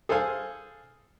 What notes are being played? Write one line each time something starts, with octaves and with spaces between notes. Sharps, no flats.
G#4 A4 C5 F5 G#5